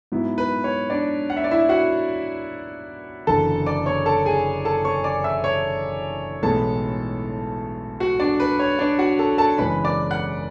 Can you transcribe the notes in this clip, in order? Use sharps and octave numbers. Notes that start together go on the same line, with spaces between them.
G#2 F#3 B3 E4
B4
C#5
D4 D5
F#5
E5
D5
E4 E5
F#4 F#5
F#1 E2 D3 A4 A5
D5 D6
C#5 C#6
A4 A5
G#4 G#5
A4 A5
C#5 C#6
D5 D6
E5 E6
C#5 C#6
B1 A2 E3 G#3 B3 A4 A5
F#4 F#5
D4 D5
B4
C#5
D4 D5
F#4 F#5
A4 A5
A4 A5
F#1 E2 C#3 G#3 C#4 B4 B5
D5 D6
F#5 F#6